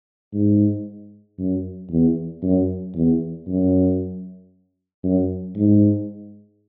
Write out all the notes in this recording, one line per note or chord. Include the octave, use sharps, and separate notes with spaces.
G#2
F#2
E2
F#2
E2
F#2
F#2
G#2